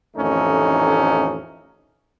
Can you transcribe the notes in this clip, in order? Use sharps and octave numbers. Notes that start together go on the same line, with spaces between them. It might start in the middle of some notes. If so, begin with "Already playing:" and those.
A1 F2 D#3 A3 C#4 D#4